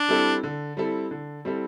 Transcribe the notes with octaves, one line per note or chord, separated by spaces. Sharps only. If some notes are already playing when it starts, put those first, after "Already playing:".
Already playing: D4
G3 C4 E4 A4
D3
G3 C4 E4 A4
D3
G3 C4 E4 A4